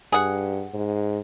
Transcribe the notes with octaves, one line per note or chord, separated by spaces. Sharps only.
G2 G#4 F#5
G#2